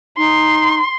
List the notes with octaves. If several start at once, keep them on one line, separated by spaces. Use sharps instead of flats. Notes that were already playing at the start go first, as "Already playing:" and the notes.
D#4 C6